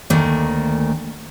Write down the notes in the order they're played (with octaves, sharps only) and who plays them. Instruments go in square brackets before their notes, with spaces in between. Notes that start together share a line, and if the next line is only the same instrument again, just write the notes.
[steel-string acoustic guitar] D2 D#3 A3 A#3